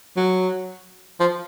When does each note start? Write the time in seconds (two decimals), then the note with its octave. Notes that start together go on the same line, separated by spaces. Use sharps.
0.17 F#3
1.20 F3